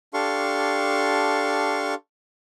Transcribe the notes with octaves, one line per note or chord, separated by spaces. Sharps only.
D4 G4 A4 F5 C6 C#6